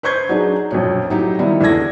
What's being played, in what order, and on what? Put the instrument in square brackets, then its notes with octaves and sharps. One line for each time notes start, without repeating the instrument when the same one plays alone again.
[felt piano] B4 C5 C#6 G6 G#6
F#3 D4 D#4 G#4
A#1 F#2 B2 C#5
A2 F#3 D#4 G4
D#3 F3 G3 B3 E4
E2 D4 A4 G#6 A#6